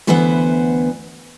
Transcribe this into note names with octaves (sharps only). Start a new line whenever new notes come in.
D2 E3 B3 B4 C5 F#5